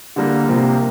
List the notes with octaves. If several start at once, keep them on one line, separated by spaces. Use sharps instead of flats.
D3 G3 A#3
C3 F3 A#3